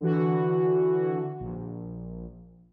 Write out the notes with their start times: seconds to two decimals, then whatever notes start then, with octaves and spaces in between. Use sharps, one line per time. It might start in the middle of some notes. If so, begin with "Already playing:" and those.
0.01 D3 E3 F#4
1.40 A#1